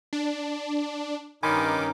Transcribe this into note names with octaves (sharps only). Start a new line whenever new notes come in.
D4
G2 D#3 C#4 D#4 G#5 B5 C6 D6